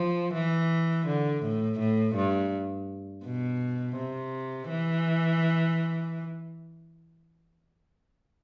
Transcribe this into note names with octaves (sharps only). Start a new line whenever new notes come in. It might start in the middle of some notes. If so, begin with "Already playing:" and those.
Already playing: F3
E3
D3
A2
A2
G2
B2
C3
E3